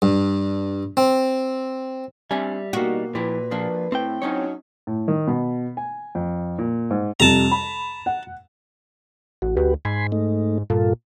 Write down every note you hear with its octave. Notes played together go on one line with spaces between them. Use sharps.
G2
C4
G3 C4 D4 E5 G#5
B2 E3 A#3 D#4 F#4
A#2 F3 E4 G4 B4
F3 A#3 D4
A2 C4 E4 G5
F#3 C#4 D#4 C#5
A2
D#3
B2
G#5
F2
A#2
G#2
F2 C3 G3 A5 A#5
B5
F#5
A1 F#4
D2 F#4 G4 B4
G#2 G#5 B5 C6
A3 D#4
G2 A#2 F4 A4